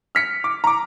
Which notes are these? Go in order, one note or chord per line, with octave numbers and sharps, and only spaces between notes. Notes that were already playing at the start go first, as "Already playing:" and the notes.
F6 B6 C#7
D6
A#5 D6